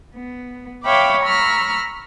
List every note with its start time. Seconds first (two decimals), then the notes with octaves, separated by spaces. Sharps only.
0.15 B3
0.84 C#5 E5 F5 G5 B5 D6
1.24 A#5 B5 C#6 E6 F6